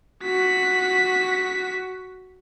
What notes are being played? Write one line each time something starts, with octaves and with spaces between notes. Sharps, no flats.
F#4 B6